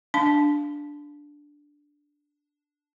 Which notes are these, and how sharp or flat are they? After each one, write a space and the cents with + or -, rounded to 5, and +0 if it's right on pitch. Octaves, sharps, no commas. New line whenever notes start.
D4 -5 F5 +0 A5 -15